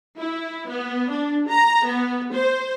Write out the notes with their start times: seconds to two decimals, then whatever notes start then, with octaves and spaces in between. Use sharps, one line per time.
0.18 E4
0.69 B3
1.11 D4
1.48 A#5
1.85 B3
2.33 C5